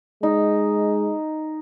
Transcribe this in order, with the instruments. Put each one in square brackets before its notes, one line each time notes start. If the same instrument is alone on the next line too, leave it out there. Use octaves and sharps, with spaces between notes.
[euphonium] G#3 [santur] D#4